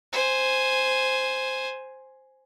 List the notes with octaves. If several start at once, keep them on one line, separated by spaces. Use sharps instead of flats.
C5 G#5